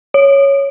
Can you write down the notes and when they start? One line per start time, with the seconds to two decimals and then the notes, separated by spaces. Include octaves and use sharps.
0.14 C#5